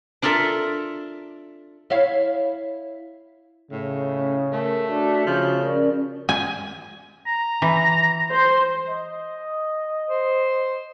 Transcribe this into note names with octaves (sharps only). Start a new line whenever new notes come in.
D4 F4 A4 A#4 E5
E4 C#5 F5
A2 C#3
C#4
A3 A#4
D4 F#4
C#3 F3
C#4 A#4 D5
G#5
A#5
E3
C5
D#5
C5